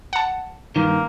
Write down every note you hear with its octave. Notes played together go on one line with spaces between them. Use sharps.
F#5 A5
G2 D#3 A#3